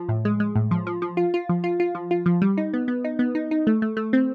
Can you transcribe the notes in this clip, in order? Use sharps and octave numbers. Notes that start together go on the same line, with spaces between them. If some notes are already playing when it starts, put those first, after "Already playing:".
Already playing: F3
A2
G#3
G#3
A2
F3
F3
F3
F4
F4
F3
F4
F4
F3
F4
F3
G3
D#4
B3
B3
D#4
B3
D#4
D#4
A3
A3
A3
C4